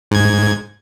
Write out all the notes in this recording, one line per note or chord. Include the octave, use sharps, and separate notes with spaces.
G#2 G#6